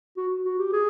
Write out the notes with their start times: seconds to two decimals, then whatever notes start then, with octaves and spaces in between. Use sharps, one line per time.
0.17 F#4
0.45 F#4
0.59 G4
0.73 G#4